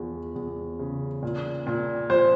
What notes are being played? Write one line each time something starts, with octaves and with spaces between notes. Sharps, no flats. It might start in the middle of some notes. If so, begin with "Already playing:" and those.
Already playing: E2 F3
E2
C#3
A#2
A#2
F3 C5